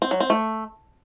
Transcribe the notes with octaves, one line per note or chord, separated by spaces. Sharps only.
C4
F#3
C4
A3